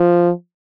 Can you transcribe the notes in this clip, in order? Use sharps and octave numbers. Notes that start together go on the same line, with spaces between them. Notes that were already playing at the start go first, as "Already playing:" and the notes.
Already playing: F3